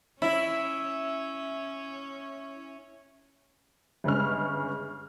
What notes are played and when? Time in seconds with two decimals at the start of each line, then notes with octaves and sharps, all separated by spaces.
0.22 C#4 E4 E5
4.04 G1 C#3 G#3 C#4 F6